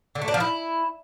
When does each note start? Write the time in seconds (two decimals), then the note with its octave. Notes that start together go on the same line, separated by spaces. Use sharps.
0.15 D3
0.22 A3
0.28 D4
0.34 F3
0.40 E4